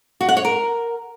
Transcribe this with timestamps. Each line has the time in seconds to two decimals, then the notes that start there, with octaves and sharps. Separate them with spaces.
0.21 F#4
0.29 F#5
0.37 C#5
0.45 A#4